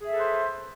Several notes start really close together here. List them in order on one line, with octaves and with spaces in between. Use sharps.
G#4 E5 A4 B4 C5